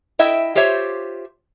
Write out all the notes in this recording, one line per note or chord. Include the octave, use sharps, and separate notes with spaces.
E4 D#5 E5 G5
F4 G4 C5 C#5 E5